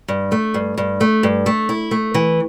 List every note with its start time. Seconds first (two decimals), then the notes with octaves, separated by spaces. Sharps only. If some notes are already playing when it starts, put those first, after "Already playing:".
0.08 G2
0.32 A3
0.54 G2
0.78 G2
1.01 A3
1.23 G2
1.46 A3
1.69 E4
1.91 A3
2.14 E3